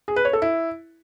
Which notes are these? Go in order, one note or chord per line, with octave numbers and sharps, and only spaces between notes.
G#4
B4
C#5
A4
E4